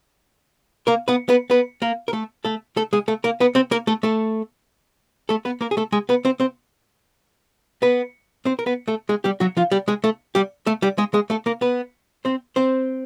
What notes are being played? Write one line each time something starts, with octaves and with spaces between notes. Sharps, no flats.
A#3 A#4
B3 B4
B3 B4
B3 B4
A#3 A#4
A#4
A3 A4
A3 A4
A3 A4
G#3 G#4
A3 A4
A#3 A#4
B3 B4
C4 C5
A#3 A#4
A3 A4
A3 A4
A3 A4
B3 B4
A#3 A#4
G#4
A3 A4
G#3 G#4
B3 B4
C4 C5
C4 C5
B3 B4
C4 C5
A#4
B3 B4
A3 A4
G#3 G#4
G3 G4
F#3 F#4
F3 F4
G3 G4
G#3 G#4
A3 A4
G3 G4
A3 A4
G3 G4
G#3 G#4
G#3 G#4
A3 A4
A#3 A#4
B3 B4
C4 C5
C4 C5